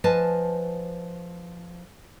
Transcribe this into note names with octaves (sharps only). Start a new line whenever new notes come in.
F3 B4 D#5 G#5 A5